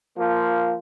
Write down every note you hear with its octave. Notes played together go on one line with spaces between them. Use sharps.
F3 A#3 F4